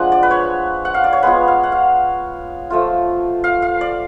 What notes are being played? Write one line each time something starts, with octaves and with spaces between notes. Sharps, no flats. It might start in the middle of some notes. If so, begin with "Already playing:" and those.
Already playing: F3 G#3 D4 F#5
D5
B4
C#5
F#5
F5
D5
C#5
G#3 B3 F4 B4
F5
F#5
F5
F3 A3 F4
F5
F5
D5